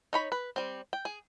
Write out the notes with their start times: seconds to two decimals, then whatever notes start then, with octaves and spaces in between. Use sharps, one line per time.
0.13 D#4 C#5 B5
0.32 B4
0.56 G3 C4
0.93 G5
1.05 G#4